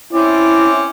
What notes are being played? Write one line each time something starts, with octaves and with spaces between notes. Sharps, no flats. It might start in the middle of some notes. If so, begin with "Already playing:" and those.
C4 C#4 E4 D5